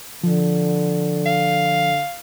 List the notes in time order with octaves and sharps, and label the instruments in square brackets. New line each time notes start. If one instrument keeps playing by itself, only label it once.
[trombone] D3 [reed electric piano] F3
[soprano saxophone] F5